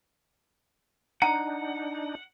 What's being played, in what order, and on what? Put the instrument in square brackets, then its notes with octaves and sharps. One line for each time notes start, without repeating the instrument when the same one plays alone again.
[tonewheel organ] D4 D#4 [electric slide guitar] F#5 [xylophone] A#5